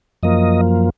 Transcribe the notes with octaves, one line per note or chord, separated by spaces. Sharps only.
F#2 F3 A#3 D#5